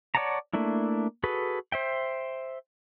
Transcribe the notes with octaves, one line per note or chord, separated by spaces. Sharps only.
C#5 D5 F#5 A5 A#5
A3 A#3 D4 E4
F#4 G#4 A4 B4
C5 E5 G5